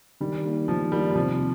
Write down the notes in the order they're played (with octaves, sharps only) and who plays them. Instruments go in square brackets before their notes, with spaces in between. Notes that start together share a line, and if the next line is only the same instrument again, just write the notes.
[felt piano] D#3 [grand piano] G3
[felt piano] A#3 D#4
[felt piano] D#3 [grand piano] F3
[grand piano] G3 [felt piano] A#3
[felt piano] D#4
[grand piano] G3
[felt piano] C3 [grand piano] F3